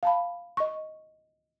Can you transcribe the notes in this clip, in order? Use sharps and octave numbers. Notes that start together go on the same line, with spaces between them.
F5 A5 B5
D#5 C#6